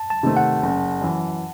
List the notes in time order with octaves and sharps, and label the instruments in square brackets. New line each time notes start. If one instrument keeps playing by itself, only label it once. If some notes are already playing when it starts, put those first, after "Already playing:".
Already playing: [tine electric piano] A5
A5
[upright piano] C3 D#3 A3 C4
[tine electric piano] F#5
[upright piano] F#1
F#2 E3